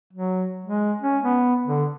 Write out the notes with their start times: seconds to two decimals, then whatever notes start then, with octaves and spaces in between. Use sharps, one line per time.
0.13 F#3
0.64 G#3
1.02 C#4
1.23 B3
1.66 D3